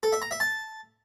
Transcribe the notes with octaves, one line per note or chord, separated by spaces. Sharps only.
A4
E5
A#5
E5
A5